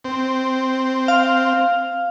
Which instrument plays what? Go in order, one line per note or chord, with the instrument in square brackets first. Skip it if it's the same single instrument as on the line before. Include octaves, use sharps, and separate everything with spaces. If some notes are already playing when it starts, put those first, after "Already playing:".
[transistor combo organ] C4
[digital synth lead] F5